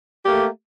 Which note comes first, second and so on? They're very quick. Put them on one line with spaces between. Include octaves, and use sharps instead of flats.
G4 A#3 A3